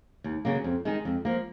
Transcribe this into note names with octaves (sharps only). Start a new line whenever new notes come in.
D#2
C#3 F#3 A#3
F2
D#3 G#3 D#4
F2
F3 A#3